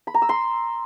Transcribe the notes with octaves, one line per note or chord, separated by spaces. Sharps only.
B5
A#5
E6
C6